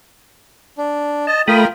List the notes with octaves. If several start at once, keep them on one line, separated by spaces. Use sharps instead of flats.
D4
D#5 A5
A3 F4 A#4 G5 B5 D#6